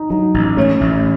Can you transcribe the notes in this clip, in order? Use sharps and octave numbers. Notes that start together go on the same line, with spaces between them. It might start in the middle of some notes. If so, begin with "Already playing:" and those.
Already playing: D#4
F#3 D#4
A1
A3 C#4
A1